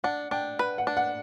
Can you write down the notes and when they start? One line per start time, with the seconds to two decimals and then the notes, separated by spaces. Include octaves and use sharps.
0.04 D4 F#5
0.31 D4 G5
0.59 B4
0.78 F#5
0.87 D4
0.97 F#5